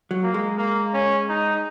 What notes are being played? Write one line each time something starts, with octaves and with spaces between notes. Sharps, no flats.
F#3
A#3
G#3
A#3
C#4
D#4